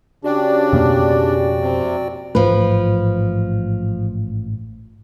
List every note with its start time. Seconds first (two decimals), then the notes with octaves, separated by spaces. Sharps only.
0.24 C#3 D4 F#4 G4 D5 G5
0.73 F2 B2 A#3
1.60 C3
2.35 A1 G#2 F3 A3 B4